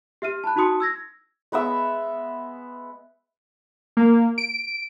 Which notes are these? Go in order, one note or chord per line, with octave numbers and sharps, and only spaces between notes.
G4 E5 F6 D#7
A5 B5 F#6
D#4 F#4 A5 C6 D#6 C#7
E6 G#6 A#6
G#3 B3 E5 E6
A#3
D7